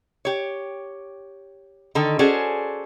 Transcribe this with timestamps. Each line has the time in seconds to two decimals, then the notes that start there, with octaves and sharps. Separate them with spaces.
0.25 G4 C#5
1.95 D3 D#3 A4
2.19 C#4 F#4 G#4 A4 C5 D5